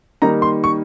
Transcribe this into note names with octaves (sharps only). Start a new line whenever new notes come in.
D#3 G3 A#3 D#4 A#5
C6
C#6